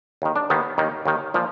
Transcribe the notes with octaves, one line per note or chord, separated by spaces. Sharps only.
D#2 D#3
D4
D#2 D#3 B3
D#2 D#3
D#2 D#3
A#2 F3